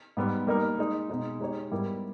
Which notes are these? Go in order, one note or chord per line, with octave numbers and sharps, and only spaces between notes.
G#2 G3 B3
G3 A#3 D#4 A#4
G#3 D#4 G#4
B2 G#3 D#4
G#3 D#4 G4 C#5
G#2 G3 B3 E4 A#4